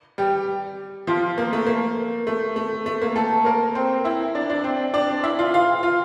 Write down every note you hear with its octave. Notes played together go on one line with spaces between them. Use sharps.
G3 G4
F3 F4
A#3
A3
A#3
A3
A3
A3
A#3
A3 A4
A#3 A#4
C4 C5
E4 E5
D4 D5
D4 D5
C4 C5
D4 D5
E4 E5
F4 F5
F4 F5
F4 F5